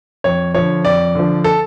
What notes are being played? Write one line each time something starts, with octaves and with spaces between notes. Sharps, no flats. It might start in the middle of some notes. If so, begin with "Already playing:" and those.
F2 C#5
D3 F3 C#5
F2 D5
D3 F3
A4